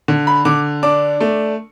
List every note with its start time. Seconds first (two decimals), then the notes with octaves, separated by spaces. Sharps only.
0.08 D3
0.27 B5
0.45 D3 D6
0.83 D4 D6
1.21 A3